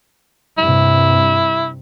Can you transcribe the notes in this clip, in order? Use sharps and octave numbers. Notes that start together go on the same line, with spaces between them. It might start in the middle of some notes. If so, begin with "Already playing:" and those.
G2 C3 E4